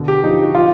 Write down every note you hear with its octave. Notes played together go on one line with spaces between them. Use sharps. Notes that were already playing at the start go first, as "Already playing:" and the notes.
Already playing: B2 D3
G4
F3 D#4
F#4
F3 F4